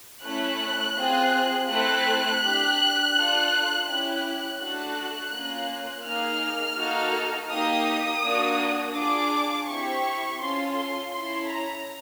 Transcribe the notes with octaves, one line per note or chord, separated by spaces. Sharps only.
A3 C#4 E4 A4 F#6
C4 F4 G#4
A3 C4 E4 A4 F#6
D4 G4
D4 F4 A4
C#4 E4 G4 F#6
A3 D4 F#4 A4 F#6
A#3 C#4 F4
A#3 D#4 G#4 F6
A#3 D#4 F#4 A4
A#3 D#4 G4 D#6
A#3 D4 F#4
D4 F4 G#4 D6
C4 E4 G4 C#6
C#4 F4 A4 C6
C6
C#4 E4 A4 C6
A#5